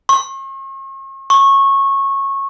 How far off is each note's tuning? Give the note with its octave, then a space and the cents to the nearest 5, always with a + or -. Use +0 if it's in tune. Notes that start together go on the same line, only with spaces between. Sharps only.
C#6 -40
C#6 -20